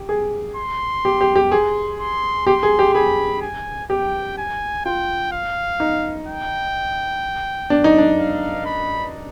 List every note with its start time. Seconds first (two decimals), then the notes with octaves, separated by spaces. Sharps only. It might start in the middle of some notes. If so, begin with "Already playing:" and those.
Already playing: G4
0.09 G#4
0.56 C6
1.05 G4
1.21 G4
1.36 G4
1.52 G#4 C6
1.99 C6
2.47 G4 C6
2.63 G#4
2.79 G4
2.94 G#4 B5
3.42 G#5
3.90 G4 G5
4.38 G#5
4.85 F4 G5
5.32 F5
5.80 D#4
6.27 G5
7.70 D4
7.84 D#4
7.98 D4
8.18 F5
8.65 B5